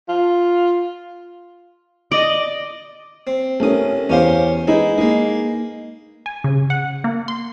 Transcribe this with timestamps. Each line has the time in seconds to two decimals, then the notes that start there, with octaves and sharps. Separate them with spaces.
0.09 F4
2.12 D5 D#5
3.27 C4
3.60 C2 A3 C#4 A#4 D#6
4.09 E2 C#4 G4 C5 F5
4.68 G#3 D#4 E4 B4
4.98 G#3 A#3 D#4
6.26 G#5
6.44 C#3
6.70 F#5
7.04 A#3
7.28 C6